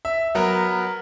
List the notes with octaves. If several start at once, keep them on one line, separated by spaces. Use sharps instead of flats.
E5
F#3 B3 A#4